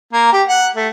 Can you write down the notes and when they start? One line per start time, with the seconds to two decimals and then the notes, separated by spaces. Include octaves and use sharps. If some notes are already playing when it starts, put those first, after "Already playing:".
0.13 A#3
0.32 G4
0.48 F#5
0.76 A3